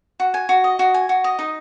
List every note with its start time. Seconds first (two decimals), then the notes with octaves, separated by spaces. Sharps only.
0.20 F#4
0.34 G#5
0.49 F#4
0.64 D#5
0.79 F#4
0.94 G#5
1.09 F#4
1.24 D#5
1.39 D#4